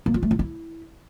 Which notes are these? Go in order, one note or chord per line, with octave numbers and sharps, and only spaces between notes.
A#3
F4
A3
F4
E4